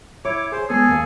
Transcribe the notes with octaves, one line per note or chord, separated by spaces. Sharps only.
E4 C#5 D6
G#4 C5
G#3 B3 G#4 A4 G#5 D#6
D#2 A#3